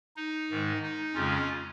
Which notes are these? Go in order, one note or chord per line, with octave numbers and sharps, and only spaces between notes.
D#4
G#2 D#3 G#3
D#4
F2 C#3 G#3 C#4 F4